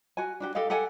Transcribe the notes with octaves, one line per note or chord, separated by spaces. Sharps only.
F#4 G#5
D4 F#4 G4
G4 A4 D#5 F5
G4 A4 F#5 G#5